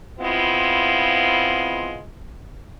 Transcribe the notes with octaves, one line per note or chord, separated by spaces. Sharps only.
G#3 B3 C4 E4 F4